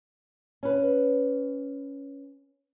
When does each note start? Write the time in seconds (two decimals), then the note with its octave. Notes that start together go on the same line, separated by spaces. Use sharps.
0.63 C#4 B4